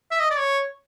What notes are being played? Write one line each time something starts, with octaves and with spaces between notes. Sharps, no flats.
E5
D#5
D5
C#5